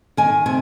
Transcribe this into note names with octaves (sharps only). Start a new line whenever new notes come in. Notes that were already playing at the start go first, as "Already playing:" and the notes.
D#3 G#5
C3 G#5